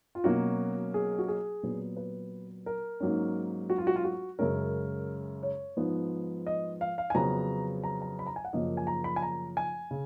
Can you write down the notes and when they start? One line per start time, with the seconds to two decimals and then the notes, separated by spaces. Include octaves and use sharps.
0.15 F4
0.24 B2 F#3 A#3 C#4 F#4
0.94 G#4
1.19 F#4
1.28 G#4
1.63 A#2 F#3 B3
1.97 B4
2.66 A#4
3.00 G#2 F#3 A#3 C#4
3.70 F#4
3.78 F4
3.87 F#4
3.96 F4
4.04 F#4
4.39 F#2 C#3 G#3 C#4 A#4
5.43 C#5
5.77 G#2 F3 B3
6.46 D#5
6.81 F5
6.98 F5
7.10 G#5
7.14 F2 C#3 F#3 B3 A#5
7.84 A#5
8.02 A#5
8.19 B5
8.27 A#5
8.36 G#5
8.45 F#5
8.53 F#2 C#3 F3 A#3 C#4 D#5
8.77 G#5
8.87 A#5
9.04 B5
9.16 G#5
9.22 A#5
9.57 G#5
9.91 C#3